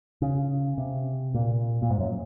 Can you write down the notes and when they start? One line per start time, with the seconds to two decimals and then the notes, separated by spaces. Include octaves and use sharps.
0.22 C#3
0.78 C3
1.34 A#2
1.82 A#2
1.90 G#2
2.00 F#2